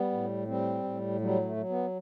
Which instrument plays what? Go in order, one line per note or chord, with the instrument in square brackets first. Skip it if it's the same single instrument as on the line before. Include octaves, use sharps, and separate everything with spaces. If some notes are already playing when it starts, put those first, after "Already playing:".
Already playing: [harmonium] G3 B3
A2
G3 C4
A2
F#3 G3
A3
F#3
B3